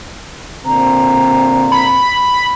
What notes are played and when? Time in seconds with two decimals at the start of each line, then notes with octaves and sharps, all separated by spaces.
0.66 A#2 D3 C4 A#5
1.72 B5